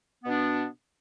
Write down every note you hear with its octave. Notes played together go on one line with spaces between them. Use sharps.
B2 B3 D4